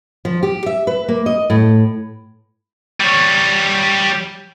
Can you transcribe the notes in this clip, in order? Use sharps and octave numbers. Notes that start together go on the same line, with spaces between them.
F3
G4
E5
B4
A#3
D#5
A2
G3 C#5